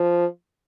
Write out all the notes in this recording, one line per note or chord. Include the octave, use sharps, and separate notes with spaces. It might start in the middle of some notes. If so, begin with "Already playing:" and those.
Already playing: F3